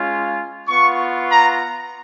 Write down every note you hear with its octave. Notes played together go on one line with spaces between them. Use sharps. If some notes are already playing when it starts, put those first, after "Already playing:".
Already playing: G#3 C#4 F4
B3 F4 C#6
A#5